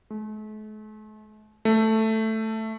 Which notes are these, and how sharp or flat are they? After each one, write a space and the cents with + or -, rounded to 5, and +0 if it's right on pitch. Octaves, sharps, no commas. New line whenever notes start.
A3 -45
A3 +5